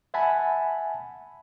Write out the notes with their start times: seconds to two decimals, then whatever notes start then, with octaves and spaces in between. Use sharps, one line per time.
0.14 E5 F#5 G#5 A5 B5